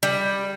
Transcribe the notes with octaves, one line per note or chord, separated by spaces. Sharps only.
G3